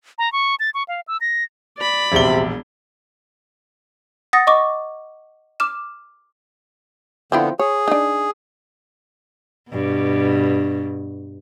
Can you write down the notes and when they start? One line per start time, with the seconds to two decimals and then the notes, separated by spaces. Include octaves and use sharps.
0.18 A#5
0.33 C#6
0.60 A6
0.74 C#6
0.88 F5
1.08 E6
1.21 A#6
1.78 D5 B5
2.12 E1 A#1 C3 G7
4.33 F#5 D#6 A6 A#6
4.47 D#5 C#6 D6
5.60 D6 F6 E7
7.32 D3 F3 B3 C4 E4
7.59 G#4 C#5
7.88 D4 D#4
9.71 G2 B2